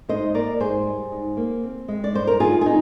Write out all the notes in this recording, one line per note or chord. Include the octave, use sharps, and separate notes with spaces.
G#2 C5 D#5
A#3 A#4 D5
G#2 G#4 C5
G3
G#2
A#3
C4
G#3
D5
G2 C5
A#4
D#3 F4 G#4
G#4
C4 D#4